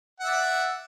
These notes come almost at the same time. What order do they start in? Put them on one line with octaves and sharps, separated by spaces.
F#5 E5 D5